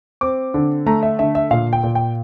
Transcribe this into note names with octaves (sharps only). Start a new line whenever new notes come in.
C4 D6
D3
A3 A#5
E5
D3 E5
E5
A#2 F5
G5
A#2
G5